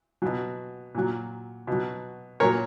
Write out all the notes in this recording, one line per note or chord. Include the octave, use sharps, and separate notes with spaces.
B2 F#3
A#2 F#3
B2 F#3
A#2 F#3 A#4 C#5